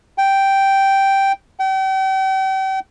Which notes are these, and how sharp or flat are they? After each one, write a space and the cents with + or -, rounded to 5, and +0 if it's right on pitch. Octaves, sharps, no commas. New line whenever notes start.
G5 -5
G5 -40